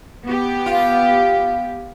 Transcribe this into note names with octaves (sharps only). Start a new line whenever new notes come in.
B3 G4
F4